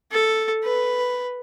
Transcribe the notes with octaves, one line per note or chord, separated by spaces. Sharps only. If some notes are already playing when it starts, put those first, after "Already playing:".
A4
B4